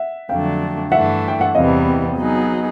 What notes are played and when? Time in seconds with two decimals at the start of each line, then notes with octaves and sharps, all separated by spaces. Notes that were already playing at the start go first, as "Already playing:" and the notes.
Already playing: E5 F#5
0.29 F2 D3 F#3 A3 D4 F5 G5
0.92 G2 E3 A3 D4 E5 F#5
1.28 G5
1.41 F#5
1.55 E2 C3 E3 G3 B3 D#5 F5
2.17 F#3 B3 D#4 G#4